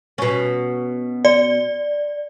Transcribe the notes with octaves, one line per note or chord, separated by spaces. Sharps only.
B2 C#4
D5